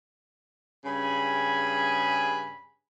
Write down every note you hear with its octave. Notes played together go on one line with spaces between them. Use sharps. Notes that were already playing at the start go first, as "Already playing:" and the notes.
G2 C#3 G#4 G#5 B5